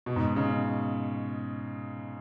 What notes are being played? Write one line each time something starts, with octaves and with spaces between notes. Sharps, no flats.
B2
G#2
C#3